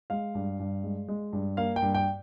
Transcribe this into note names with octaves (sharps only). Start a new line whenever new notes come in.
G#3 F5
G2
G2
G#3
G#3
G2
A#3 F5
G5
G2
G5